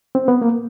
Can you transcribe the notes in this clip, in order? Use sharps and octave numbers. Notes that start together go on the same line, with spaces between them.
C4
B3
A#3